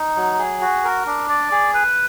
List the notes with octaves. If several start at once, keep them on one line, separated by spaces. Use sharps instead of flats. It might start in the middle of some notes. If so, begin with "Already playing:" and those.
Already playing: D#4
F#3
G#4
F#4
A#4
D4
D5
G#4
B4